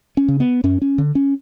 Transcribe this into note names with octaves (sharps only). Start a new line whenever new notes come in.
C#4
C#3
B3
F#2 C#4
C#4
D3
C#4